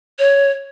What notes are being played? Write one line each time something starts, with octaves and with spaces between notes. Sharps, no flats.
C#5